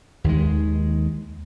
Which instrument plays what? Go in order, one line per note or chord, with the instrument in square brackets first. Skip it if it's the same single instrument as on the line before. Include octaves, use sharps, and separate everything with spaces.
[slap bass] D#2 D#3 G#3